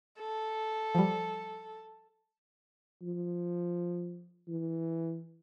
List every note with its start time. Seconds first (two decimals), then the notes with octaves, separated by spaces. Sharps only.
0.19 A4
0.95 F3 G3
3.02 F3
4.48 E3